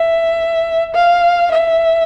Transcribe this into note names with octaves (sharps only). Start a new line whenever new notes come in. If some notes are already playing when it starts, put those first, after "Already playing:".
Already playing: E5
F5
E5